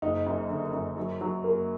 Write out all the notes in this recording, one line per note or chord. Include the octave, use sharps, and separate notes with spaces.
F#1 D#4
F#2
D3
F#2
F#3
F#3
A#3